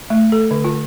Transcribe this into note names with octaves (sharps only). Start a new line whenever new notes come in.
A3
A4
D3
F4